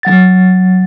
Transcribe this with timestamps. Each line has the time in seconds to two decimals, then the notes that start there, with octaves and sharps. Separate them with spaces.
0.03 F#3 F#5 A6